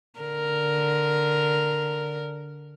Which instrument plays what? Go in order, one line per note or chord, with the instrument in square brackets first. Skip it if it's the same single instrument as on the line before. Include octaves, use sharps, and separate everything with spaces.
[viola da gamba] D3 A#4